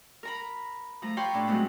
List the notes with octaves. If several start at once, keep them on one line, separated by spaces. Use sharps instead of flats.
A#4 A#5 B5
F3 A3 A#5
F4 G4 C#5 G5 B5 C6
A2 D4
F#3 G#3 A3 B3 C4 E4